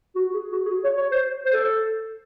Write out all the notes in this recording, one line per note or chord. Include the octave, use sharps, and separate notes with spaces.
F#4
F#4
G#4
F#4
G#4
F#4
C#5
C#5
C5
C5
A4